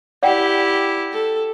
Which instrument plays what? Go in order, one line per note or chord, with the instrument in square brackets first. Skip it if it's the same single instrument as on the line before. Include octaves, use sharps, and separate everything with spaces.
[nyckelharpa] E4 G4 [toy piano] D5 F#5 G5
[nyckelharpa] A4